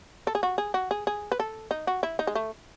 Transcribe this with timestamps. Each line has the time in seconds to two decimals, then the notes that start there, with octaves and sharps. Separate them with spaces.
0.27 A4
0.35 G#4
0.43 F#4
0.58 G#4
0.74 F#4
0.91 G#4
1.07 G#4
1.32 B4
1.40 A4
1.71 D#4
1.87 F#4
2.03 E4
2.19 D#4
2.27 G#3
2.35 A3